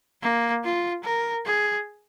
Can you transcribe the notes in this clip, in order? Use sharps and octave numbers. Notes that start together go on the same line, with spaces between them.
A#3
F4
A#4
G#4